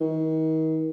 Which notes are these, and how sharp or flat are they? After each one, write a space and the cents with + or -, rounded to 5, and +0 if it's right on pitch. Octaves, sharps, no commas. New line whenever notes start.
D#3 +35